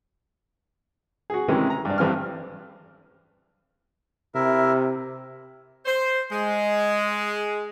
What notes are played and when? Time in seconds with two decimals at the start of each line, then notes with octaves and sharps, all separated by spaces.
1.30 F#4 G#4
1.48 C3 D#3 E3 G#3 C#4
1.70 A#5
1.85 G2 D4
1.98 A1 G2 E3 C4 F6
4.35 C3 E4 A#4 E5
5.86 C5
6.31 G#3